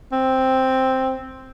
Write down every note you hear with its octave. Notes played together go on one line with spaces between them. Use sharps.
C4